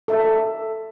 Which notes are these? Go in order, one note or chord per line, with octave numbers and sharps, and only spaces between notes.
A4 E5